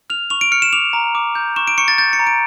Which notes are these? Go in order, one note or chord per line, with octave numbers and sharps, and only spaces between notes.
F6 F7
C#6 F7
D7
F6 C#7
E7
D6 F7
A#5
D6
G6
C#6 E7
D7
C#6 C#7
A6
G6 A6
C#7
A#5
D7